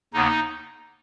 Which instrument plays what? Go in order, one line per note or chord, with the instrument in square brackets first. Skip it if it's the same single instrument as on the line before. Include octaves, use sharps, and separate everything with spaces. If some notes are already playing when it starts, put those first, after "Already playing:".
[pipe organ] D#2 C#3 B3 D#4